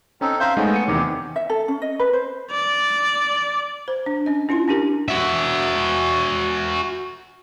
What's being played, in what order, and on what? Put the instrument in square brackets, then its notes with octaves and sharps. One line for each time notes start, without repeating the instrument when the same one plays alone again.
[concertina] C4 D#4 A4 [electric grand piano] C#4
[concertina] C5 E5 F5 [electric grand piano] A#5 C6 G6
[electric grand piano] G#3 A3 D#4 [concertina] B3 C#4
[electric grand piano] C#7 D#7
[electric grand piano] E2 C3 D#3 [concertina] G4
[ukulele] E5
A4
C#4
D#5
B4
C5
[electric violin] D5
[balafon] C5
D4
C#4 D#5
C#4 E4 F4 C6
C#4 D4 G4 A#4
[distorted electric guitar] F#4 E5